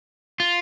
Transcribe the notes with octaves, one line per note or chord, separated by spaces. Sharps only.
F4